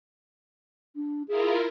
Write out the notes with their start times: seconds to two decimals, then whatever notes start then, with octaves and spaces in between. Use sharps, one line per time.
0.96 D4
1.28 E4 F4 G#4 A#4